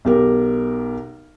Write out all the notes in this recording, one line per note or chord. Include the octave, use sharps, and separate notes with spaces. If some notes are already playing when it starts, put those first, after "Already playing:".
B1 G4 A#4